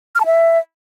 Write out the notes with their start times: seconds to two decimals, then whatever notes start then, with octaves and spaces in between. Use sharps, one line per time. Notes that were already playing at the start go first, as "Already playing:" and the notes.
0.15 F6
0.20 A5
0.26 E5